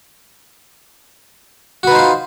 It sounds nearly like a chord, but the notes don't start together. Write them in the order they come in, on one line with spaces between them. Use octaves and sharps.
F#4 B4 D#4 C5 F4